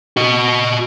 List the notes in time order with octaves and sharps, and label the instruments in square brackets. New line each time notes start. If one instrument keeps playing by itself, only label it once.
[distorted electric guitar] F#4 D#5